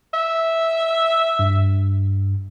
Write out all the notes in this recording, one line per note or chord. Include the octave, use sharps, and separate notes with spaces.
E5
G2